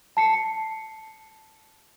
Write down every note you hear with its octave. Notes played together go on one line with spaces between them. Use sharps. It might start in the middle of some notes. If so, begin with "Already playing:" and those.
A5 C7 C#7